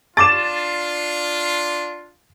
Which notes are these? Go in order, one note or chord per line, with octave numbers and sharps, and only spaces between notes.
D4 F4 A5 C#6 D6 A6 E7